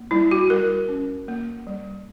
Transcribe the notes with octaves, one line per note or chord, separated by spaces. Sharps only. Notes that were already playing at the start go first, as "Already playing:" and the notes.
Already playing: A#3
G3 E4
F#4
G3 A#4
C#4
A#3
G3